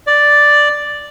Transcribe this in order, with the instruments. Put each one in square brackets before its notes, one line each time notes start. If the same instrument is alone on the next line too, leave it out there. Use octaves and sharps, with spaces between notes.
[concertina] D5